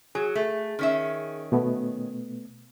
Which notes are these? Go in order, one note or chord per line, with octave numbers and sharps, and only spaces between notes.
F#3 G#4
A3
D#3 C#4 E5
B2 A3 B3